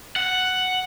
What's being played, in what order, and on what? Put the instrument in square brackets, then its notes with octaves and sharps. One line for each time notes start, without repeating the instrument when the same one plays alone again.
[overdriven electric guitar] F#5